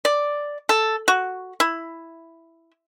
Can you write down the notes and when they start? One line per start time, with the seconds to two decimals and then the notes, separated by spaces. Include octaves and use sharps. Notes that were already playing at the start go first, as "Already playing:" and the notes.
0.05 D5
0.69 A4
1.08 F#4
1.60 E4